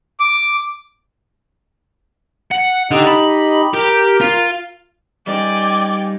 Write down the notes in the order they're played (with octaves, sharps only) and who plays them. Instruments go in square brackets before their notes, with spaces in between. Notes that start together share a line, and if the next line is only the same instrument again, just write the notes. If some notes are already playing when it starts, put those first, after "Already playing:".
[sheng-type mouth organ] D6
[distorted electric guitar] F#5
[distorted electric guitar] D3 [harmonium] D#4 G4 D#5
[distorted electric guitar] B5
[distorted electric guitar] G4 [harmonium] A#4
[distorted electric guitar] F4
[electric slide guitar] G3 D#4 [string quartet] D5 G5 G#5 [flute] D6